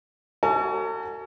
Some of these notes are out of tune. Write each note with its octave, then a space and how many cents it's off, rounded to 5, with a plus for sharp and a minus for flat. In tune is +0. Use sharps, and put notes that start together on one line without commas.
F#4 +25 A4 +45 G#5 +25